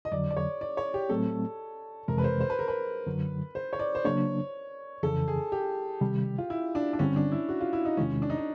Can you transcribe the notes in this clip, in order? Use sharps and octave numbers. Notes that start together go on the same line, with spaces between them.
D#5
F2 D3 F#3 D5
D5
C#5
D5
C#5
G4
A2 F#3 A3 C4 A4
F2 C3 E3 G#3 A#4
B4
C5
C5
B4
A#4
B4
F#2 D3 F#3
C5
C#5
D5
C5
C#3 F#3 A#3 D4 C#5
F2 C#3 E3 A4
G#4
G4
C3 D#3 G3
F4
E4
D4
D4
G2 D3 G3 C4 C#4
D4
E4
F#4
F4
E4
D#4
E2 C3 D#3 G#3 C#4
D4
D#4
D4